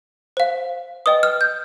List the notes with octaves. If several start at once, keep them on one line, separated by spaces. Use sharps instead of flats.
C5 F5
B4 D#5 G5 D#6
F6
G6